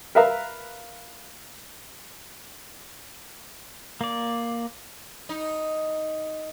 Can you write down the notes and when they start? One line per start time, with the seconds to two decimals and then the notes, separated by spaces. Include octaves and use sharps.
0.15 A#4 B4 E5 F5 A#5
4.01 A#3 D5
5.29 D#4